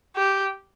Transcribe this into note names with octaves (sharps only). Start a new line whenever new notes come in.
G4